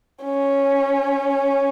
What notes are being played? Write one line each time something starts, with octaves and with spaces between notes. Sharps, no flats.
C#4